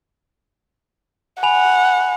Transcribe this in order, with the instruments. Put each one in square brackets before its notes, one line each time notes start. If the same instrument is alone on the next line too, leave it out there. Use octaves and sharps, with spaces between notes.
[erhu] F#5 [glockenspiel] G#5 B5 F7